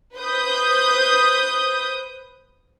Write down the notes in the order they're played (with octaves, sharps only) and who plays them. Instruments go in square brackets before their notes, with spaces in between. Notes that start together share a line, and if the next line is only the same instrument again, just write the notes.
[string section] B4 C5 D#6 G6